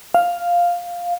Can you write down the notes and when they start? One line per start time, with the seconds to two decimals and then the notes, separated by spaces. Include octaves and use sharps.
0.14 F5